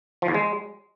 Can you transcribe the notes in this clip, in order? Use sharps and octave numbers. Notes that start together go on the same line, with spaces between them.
F3
E2
G#3